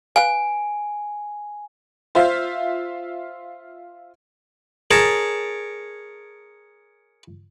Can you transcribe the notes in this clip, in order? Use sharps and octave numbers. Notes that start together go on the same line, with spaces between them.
B4 F5 G#5
F4 C5 E5 F5
G#4 A#4 C#5 A5